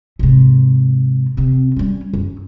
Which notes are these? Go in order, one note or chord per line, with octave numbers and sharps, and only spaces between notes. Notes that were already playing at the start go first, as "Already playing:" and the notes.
G#2 C3
C3 C4
G3 C#4
F#2